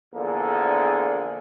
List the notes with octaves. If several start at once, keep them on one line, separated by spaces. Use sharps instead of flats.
A#1 E2 D3 A#3 G#4 A4